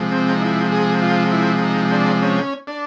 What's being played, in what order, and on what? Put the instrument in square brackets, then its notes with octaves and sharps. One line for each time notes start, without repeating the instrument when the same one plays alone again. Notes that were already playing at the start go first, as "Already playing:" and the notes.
Already playing: [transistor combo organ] C3 F3 G#3
C4
D#4
E4
G#4
F4
E4
D#4
D4
C#4
D4